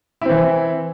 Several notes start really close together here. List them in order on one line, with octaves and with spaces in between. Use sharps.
E4 C4 E3